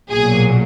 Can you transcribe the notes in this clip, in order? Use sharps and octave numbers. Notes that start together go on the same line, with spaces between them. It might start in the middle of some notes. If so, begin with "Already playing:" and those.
B1 A#2 F#3 G#4